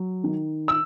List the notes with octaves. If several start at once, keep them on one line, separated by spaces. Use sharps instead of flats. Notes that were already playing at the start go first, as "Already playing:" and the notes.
Already playing: F#3
D#3
E6